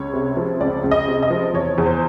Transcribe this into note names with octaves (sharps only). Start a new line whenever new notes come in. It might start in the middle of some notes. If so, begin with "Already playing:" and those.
Already playing: C#2 C#5
C3
F3
C#2 D5
C#2
D#5
C3
D#5
F3
E2 C#5
E2
C5